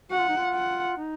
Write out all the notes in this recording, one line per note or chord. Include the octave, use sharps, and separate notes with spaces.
F#4 F#5
F4
D#4
F4
F#5
D#4